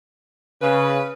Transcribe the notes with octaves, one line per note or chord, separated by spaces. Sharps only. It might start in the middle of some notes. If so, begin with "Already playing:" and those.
C#3 B4